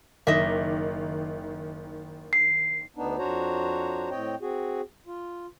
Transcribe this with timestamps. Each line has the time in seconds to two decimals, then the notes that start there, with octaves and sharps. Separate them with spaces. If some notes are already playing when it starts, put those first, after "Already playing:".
0.27 F#1 D#3 D#5 E5 D6
2.33 C7
2.97 D2 B3 D4 D#4
3.18 F2 D4 F#4 C5 C#5 A#5
4.11 A2 C4 C#5 D#5 G5
4.42 C4 F#4 G#4
5.07 F4